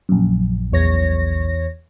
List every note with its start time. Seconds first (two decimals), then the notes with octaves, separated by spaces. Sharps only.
0.09 A#1 F#2
0.72 E2 C#5 A#6